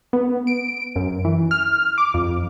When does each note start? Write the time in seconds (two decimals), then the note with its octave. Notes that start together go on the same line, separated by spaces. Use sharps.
0.13 B3
0.47 D7
0.96 F#2
1.25 E3
1.51 F6
1.98 D6
2.14 F2